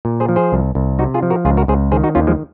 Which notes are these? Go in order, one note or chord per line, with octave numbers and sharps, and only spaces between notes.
A#2
G#4 C5
F3
G#4 C5
C2
C2
C3 D#4 F#4
F4 G#4
F3
F#4 A#4
C#2 F4 G#4
F#4 A#4
C#2 G#4 C5
D#3 G#4 C5
D#4 F#4
D#2 C#4 F4
F3 G#3